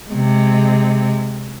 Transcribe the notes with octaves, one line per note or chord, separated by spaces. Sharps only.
C3 G#3